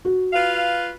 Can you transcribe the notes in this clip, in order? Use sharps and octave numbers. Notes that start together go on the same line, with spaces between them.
F#4
F4 B4 F5